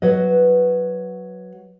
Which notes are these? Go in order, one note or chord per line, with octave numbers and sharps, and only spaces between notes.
F#3 B4 D#5